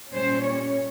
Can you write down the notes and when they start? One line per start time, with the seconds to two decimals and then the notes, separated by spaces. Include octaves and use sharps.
0.12 A#2 G3 C#4 C5
0.41 C#5